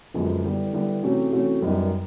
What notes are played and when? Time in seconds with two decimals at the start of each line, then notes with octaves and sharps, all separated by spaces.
0.14 F#2 D3 F3 G#3 B3
0.44 D3 G3 B3 E4
0.73 D3 G3 B3 E4
1.03 C3 E3 A3 C#4 F#4
1.33 C3 E3 A3 C#4 F#4
1.62 F#2 D#3 G3 B3 D#4